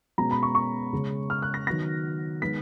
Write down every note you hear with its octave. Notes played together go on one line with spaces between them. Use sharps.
B2 G#3 C#4 A#5
B5
C#6
C#6
C#3 G#3 C#4
F6
F#6
A#6
D#3 F#3 B3 A#6
D#3 G#3 B3 B6